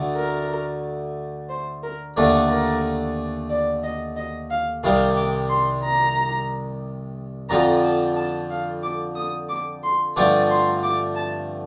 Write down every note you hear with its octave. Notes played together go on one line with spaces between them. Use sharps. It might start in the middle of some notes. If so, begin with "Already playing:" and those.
Already playing: D2 D3 A3
A#4
C5
A#4
D#2 D3 A3 D4 A#4
A#4
D5
D#5
D#5
F5
C2 C3 D#3 G3 F5
D6
C6
A#5
F2 D3 F3 C4 A#5
A5
A5
F5
D6
D#6
D6
C6
G2 D3 F3 A3 C4 D6
C6
D6
A5